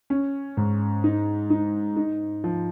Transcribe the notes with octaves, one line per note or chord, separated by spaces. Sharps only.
C#4
G#2
D#4
D#4
D#4
F3